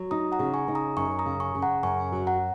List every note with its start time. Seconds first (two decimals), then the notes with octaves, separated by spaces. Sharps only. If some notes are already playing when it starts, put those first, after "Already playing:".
Already playing: F#3
0.11 D#4 A#5 D#6
0.32 F#5 A#5
0.39 C#3
0.54 G#5 C#6
0.68 D#4
0.75 A#5 D#6
0.97 F#2 G#5 C#6
1.19 A#5 D#6
1.25 C#3
1.40 G#5 C#6
1.55 C#3
1.62 F#5 A#5
1.83 F#2 G#5 C#6
2.12 F#3
2.27 F#5 A#5